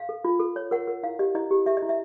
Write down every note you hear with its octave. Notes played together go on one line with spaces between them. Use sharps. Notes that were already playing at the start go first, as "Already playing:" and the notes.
Already playing: F5
A4
F4
A4
C#5
A#4 F#5
A#4
E4 F5
G4 D#5
E4 D#5
G4
G4 E5
D#5
E4
E5